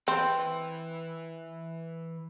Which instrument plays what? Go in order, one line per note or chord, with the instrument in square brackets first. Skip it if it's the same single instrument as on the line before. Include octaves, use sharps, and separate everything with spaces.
[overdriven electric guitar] E3 B4 [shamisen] C4